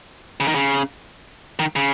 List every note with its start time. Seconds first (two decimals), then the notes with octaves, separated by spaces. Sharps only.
0.40 C#3
0.48 D#3
0.55 C#3
1.59 D#3
1.76 C#3